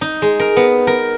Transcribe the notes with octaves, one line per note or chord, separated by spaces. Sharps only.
D#4
G#3
A#4
B3
A#4